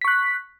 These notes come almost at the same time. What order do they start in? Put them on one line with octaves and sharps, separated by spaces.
B6 C#6 F#6